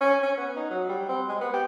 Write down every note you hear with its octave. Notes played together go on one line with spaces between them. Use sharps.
C#4
C#4
B3
D#4
F#3
G3
C4
G#3
B3
G4